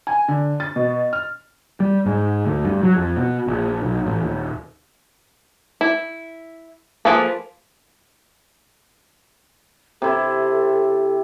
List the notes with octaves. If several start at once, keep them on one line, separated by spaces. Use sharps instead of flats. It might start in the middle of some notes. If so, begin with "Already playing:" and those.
G#5
D3
A6
B2
F6
G3
G#2
D2
G2
F#3
F2
B2
A#1
B1
A1
D#1
E4
F3 A#3 G#4 A4 B4
C3 E4 A4